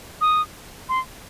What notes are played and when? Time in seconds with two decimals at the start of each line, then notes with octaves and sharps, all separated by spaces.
0.21 D#6
0.89 C6